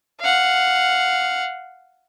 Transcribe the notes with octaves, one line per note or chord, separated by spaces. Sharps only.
F5 F#5